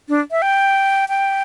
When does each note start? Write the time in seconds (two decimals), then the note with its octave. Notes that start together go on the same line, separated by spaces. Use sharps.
0.09 D4
0.31 E5
0.42 G5
1.09 G5